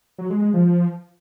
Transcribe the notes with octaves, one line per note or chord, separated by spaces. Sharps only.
F#3
G#3
G#3
F3